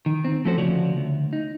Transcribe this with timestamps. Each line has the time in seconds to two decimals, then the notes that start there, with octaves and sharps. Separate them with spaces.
0.06 D#3
0.25 C4
0.45 F3 A3 C#4 F#4 A4 C5
0.58 D2 C#3 F3 F#4 C#5 D5
0.97 D2
1.33 D#4